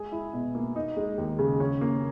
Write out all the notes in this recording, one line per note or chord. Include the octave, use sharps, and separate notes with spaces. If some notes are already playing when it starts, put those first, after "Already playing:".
Already playing: G#3 G#4
E4
B2
A#3
D#4
G#3
D#2
C#3
C#4
A#3